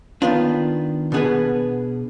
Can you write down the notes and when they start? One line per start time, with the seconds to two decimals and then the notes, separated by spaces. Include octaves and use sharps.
0.22 D#3 B3 D4 F4
1.12 B2 B3 D4 G#4 B4